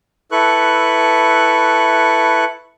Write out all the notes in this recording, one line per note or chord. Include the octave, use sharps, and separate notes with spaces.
E4 A4 B4 C#6 F#6